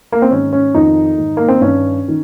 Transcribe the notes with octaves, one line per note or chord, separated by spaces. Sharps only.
A#3
C4
G#2 D#3 C#4
C#4
F2 D#3 D#4
G#2 D#3
A#3
C4
G2 D#3 C#4
D#3